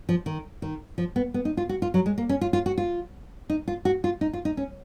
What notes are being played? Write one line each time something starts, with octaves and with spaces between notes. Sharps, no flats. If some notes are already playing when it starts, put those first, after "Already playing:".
F3
D#3
D#3
F3
B3
B3
D#4
F4
F#4
F4
F#3
G#3
A#3
C#4
F4
F4
F#4
F4
D#4
F4
F#4
F4
D#4
F4
D#4
C#4